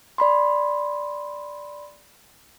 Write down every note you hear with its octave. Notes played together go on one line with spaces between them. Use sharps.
D5 B5 C6